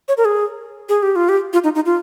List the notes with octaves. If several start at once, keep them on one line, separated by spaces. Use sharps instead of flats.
C#5
A#4
G#4
G#4
G4
F4
G4
F4
D#4
D#4
F4